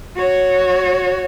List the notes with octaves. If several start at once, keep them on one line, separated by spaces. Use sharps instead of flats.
F#4 C#5